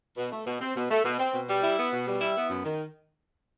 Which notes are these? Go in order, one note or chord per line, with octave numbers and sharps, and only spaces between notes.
B2
A3
B2
C4
B2
A3
B2
C4
B2
G3
E4
B3
B2
G3
E4
B3
F#2
D#3